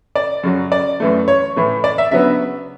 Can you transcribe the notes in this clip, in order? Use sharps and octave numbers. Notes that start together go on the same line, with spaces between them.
D5
F#2 C#3 F#3
D5
F#2 E3 A3
C#5
A2 E3 A3
D5
E5
C#3 F#3 B3 D4 E5